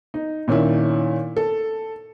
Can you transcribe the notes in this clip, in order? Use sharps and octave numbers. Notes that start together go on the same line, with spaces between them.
D#4
A#2 D#3 C#4 D4 E4
A4